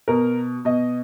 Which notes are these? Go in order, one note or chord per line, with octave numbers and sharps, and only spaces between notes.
B2 A#4
B2 D#5